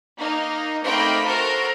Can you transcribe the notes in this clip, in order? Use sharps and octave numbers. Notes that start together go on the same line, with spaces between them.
A#3 D#4
A3 A#3 C4 D#4 G5 B5
F#4 A4 A#4 C5